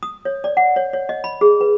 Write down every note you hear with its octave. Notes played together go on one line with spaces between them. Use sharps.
D#6
C#5
D5
F#5
C#5
C#5
D#5
B5
G#4
B4